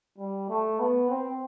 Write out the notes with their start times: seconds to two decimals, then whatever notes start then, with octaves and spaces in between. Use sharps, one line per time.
0.18 G3
0.49 A3
0.79 B3
1.10 C4